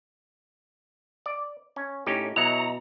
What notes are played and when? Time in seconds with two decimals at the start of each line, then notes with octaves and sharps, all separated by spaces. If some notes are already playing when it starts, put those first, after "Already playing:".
1.26 D5
1.76 C#4
2.06 A2 C#4 D#4 G4
2.36 B2 F#3 E4 D#5 A#5 C#7